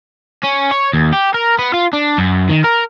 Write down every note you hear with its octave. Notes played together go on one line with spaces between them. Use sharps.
C#4
C#5
D#2
G4
A#4
B3
F4
D4
F#2
D#3
A#4